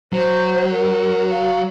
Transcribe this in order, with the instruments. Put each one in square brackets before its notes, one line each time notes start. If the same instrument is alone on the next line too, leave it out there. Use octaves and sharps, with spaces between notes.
[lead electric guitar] F#3 [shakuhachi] C5
[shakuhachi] A#4
F5